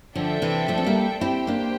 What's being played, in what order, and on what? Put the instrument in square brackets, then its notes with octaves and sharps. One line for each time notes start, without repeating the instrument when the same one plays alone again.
[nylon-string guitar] D3 F3 [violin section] D4 A4 E5 G5
[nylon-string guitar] C3 E3
F3 A3
C4
G3 A#3
[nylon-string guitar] C4 E4 [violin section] G4 C5 G5
[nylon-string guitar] A#3 D4